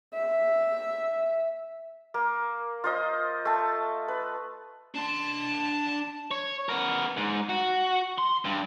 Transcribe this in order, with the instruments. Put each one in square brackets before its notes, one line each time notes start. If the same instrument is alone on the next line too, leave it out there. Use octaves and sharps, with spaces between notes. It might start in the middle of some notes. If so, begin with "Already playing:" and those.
[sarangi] E5
[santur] A#3
F4 C5 D#5
A3 A5
B4
[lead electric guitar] D4 C6 [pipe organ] A5
[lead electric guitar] C#5
B3 A#4
G#2
F#4
C6
G2